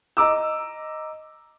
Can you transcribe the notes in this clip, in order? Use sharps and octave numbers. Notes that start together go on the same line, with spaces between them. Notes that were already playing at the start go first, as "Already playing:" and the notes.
D#5 A#5 D6 E6